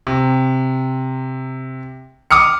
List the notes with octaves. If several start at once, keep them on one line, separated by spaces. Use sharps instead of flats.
C3
D6 D#6 F6 C#7